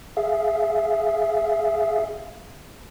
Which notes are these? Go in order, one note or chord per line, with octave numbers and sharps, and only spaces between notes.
G#4 E5 F5